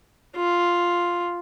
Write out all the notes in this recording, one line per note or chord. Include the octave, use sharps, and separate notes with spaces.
F4